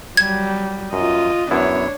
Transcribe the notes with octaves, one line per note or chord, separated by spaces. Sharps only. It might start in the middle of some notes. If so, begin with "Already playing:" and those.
F#3 G3 G#6
F#2 F4 D#5
F#2 B3 D4 E4 C#5